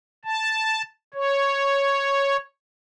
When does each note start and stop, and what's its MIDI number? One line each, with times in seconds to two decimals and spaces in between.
0.25 0.82 81
1.14 2.37 73